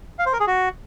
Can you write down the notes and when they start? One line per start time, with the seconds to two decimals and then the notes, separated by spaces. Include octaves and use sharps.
0.19 F5
0.26 C5
0.33 A#4
0.40 G#4
0.47 F#4